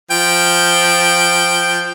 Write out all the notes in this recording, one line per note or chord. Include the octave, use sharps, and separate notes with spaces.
F3 G5